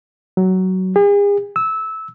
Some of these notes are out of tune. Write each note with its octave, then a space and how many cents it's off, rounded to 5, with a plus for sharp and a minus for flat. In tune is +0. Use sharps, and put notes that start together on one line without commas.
F#3 +15
G#4 -40
E6 -15